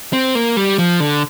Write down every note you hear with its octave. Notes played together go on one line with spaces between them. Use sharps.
C4
A#3
G3
F3
D3